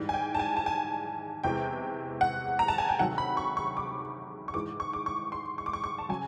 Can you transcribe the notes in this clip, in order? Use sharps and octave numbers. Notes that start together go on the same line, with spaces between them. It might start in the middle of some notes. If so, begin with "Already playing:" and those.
Already playing: G#2 E3 G3
G#5
G5
A5
G#5
A5
G#5
E2 C3 E3 G#3 G5
F#5
A#5
A5
G#5
G5
D2 C3 D#3 F#3 F#5
B5
C#6
C#6
D6
C#6
G#2 E3 G#3 D6
C#6
D6
C#6
C6
C#6
D6
C#6
C#6
A5
C#3 F#3 G#5